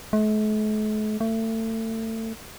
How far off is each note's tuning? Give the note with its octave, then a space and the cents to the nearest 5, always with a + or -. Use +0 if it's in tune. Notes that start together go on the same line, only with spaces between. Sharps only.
A3 -45
A3 +30